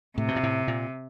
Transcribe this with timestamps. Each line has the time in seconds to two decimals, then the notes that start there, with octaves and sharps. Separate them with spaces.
0.18 A2 C3
0.28 B2
0.36 A#2
0.43 A2
0.68 A#2